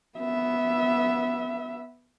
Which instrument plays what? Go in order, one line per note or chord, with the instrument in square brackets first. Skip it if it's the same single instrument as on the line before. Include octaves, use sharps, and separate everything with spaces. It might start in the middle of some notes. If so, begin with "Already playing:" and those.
[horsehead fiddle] B3 E5